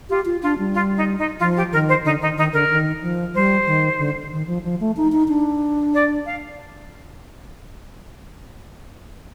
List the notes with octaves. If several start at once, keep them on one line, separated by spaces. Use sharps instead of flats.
F4 G4
F4
D4 F4
G3
F4
D#4
D#4
F3 F4
G4
D#3 A#4
C5
D3 D#4
D#3 D#4
D#3 D#4
D3 A#4
D#3
F3
G3 C5
D#3
D3
D#3
F3
F3
A3
D#4
D#4
D4
D5
F5